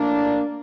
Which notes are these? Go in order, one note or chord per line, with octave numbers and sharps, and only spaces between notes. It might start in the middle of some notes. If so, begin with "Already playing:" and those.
Already playing: A2 F3 A#3 D4